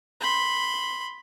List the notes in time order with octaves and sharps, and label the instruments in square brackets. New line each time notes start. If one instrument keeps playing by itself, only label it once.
[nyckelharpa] B5 C6